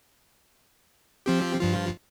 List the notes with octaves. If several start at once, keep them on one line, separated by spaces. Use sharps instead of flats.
F3 C4 G4
G2 F3 F4